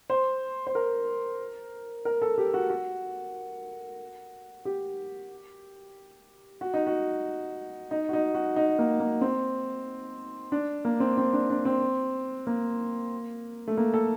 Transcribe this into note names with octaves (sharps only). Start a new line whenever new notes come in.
C5
C5
A#4
A#4
A4
G4
F#4
F#4
G4
F#4
D#4
F#4
D#4
F#4
D#4
F#4
D#4
A#3
A#3
C4
D4
A#3
C4
C4
D4
D4
C4
A#3
A3
A#3
A4